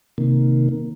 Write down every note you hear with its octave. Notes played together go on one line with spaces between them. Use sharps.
C3 D#3 A#3